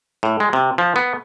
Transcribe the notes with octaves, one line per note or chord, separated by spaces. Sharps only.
A2
G#3
C3
F3
B3